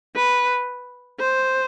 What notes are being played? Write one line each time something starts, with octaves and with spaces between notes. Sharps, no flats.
B4
C5